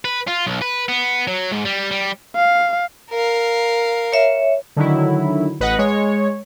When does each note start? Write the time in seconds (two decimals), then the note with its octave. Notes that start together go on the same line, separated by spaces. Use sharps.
0.05 B4
0.27 F4
0.47 B1
0.62 B4
0.89 B3
1.27 F#3
1.52 G#2
1.65 G3
1.91 G3
2.35 F5
3.10 A#4 F5
4.13 C#5 E5
4.76 D3 D#3 F#3 E4
5.60 A1 B4 D#5 F#5 F#6
5.78 G#3 C#5